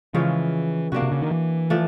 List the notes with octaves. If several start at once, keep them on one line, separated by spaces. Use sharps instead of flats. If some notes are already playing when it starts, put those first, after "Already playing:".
C#3 E3 F3 G#3 C#4
C3 A#3 D4 F#4
C3
C#3
D#3
E3
F3 A3 D4